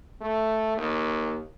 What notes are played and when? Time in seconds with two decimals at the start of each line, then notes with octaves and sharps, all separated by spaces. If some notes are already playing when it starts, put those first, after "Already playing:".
0.21 A3
0.77 D#2